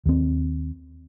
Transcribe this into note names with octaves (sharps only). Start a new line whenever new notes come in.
D#2 C4